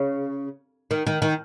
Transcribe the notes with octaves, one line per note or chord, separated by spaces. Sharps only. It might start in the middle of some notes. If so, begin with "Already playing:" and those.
Already playing: C#3
D#3
D#3
D#3